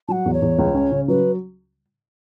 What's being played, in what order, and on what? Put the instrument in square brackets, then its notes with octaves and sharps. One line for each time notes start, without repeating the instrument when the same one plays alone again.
[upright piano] F#3 [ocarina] F#5 A5
[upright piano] E2
[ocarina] C#5
[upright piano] E2
C#2
C#4
C#3
[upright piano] F#3 [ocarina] B4